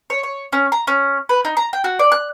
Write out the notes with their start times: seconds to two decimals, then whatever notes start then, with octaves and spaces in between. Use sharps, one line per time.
0.10 C#5
0.23 C#5
0.53 C#4
0.72 A#5
0.87 C#4
1.29 B4
1.45 D#4
1.57 A#5
1.73 G5
1.84 F#4
1.99 D5
2.12 F#6